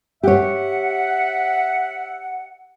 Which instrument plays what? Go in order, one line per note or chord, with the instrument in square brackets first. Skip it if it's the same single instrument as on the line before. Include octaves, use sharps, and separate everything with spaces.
[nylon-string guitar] G4 C#5 [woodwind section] E5 F#5